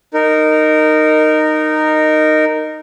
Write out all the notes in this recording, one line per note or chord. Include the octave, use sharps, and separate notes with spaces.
D#4 A#4